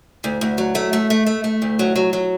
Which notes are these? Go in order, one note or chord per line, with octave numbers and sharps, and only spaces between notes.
D2
D2
F#3
A3
A3
A3
A3
A3
D2
F#3
F#3
F#3